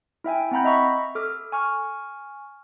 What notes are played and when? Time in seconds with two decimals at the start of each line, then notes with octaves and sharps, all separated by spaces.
0.24 E4 E5 G5 G#5
0.51 C4 F#5 A#5 B5 G6
0.64 D#5 E5 A#5 B5 C#6 B6
1.15 A4 D6 F6
1.52 G#5 C#6 F6